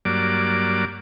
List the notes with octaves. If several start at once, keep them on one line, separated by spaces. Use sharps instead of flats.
G2 F#3 A#3 D5 D6